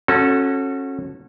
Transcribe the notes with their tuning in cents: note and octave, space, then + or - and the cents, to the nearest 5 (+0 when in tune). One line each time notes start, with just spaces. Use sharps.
C#4 -30 F#4 -10 A4 +0